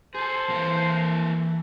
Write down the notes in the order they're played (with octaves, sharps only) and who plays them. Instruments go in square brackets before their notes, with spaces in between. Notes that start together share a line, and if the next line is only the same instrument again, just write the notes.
[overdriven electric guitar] G#4 A4 [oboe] C5
[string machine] E3 [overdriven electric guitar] A#3 A4